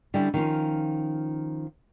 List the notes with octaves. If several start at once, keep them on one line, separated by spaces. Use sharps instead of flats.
D3 G3 C#4 E4 G4
D#3 F3 C#4 F4